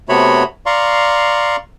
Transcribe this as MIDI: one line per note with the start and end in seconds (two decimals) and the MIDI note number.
0.09 0.43 48
0.09 0.43 57
0.09 0.43 59
0.09 0.43 66
0.09 0.43 73
0.09 0.43 83
0.66 1.56 74
0.66 1.56 77
0.66 1.56 82
0.66 1.56 84
0.66 1.56 85